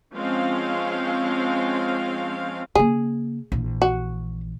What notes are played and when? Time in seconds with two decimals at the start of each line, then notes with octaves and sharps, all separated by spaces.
0.15 F3 G#3 C4 C#4 F5
2.75 C#3 A#3 G#4
3.52 A#1 E3
3.82 F#4